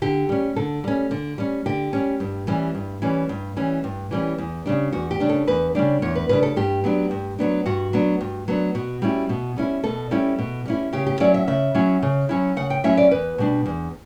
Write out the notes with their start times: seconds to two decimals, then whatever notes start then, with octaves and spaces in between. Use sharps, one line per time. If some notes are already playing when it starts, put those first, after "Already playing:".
0.02 D3 G4
0.29 G3 C#4
0.56 D3 A4
0.84 G3 C#4
1.11 D3
1.38 G3 C#4
1.66 D3 G4
1.93 G3 C#4
2.20 G2
2.47 E3 G3 C#4
2.75 G2
3.02 E3 G3 C#4
3.29 G2
3.56 E3 G3 C#4
3.84 G2
4.11 E3 G3 C#4
4.38 E2
4.66 C#3 G3 D4
4.92 E2 F#4
5.11 G4
5.20 C#3 G3 D4
5.29 A4
5.48 E2 B4
5.75 C#3 G3 D4 D5
6.02 E2 C#5
6.15 B4
6.29 C#3 G3 D4 B4
6.43 A4
6.56 G2 G4
6.84 F#3 B3 D4
7.11 G2
7.39 F#3 B3 D4
7.66 G2 F#4
7.93 F#3 B3 D4
8.21 G2
8.48 F#3 B3 D4
8.75 B2 F#4
9.02 G3 C#4 E4
9.29 B2
9.56 G3 C#4 E4
9.84 B2 A4
10.11 G3 C#4 E4
10.39 B2
10.66 G3 C#4 E4
10.93 C#3 G4
11.06 G4
11.20 F#3 C#4 E4 D5
11.34 E5
11.48 C#3 E5
11.75 F#3 C#4 E4
12.02 C#3
12.29 F#3 C#4 E4
12.56 C#3 F#5
12.70 G5
12.84 F#3 C#4 E4 E5
12.97 D5
13.11 E2 B4
13.38 B2 G3 D4
13.66 E2